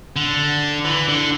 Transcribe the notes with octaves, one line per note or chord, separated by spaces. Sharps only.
D3
E3
D3